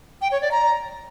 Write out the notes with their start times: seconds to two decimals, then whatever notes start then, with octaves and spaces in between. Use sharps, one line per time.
0.22 G5
0.31 C#5
0.41 D5
0.51 A#5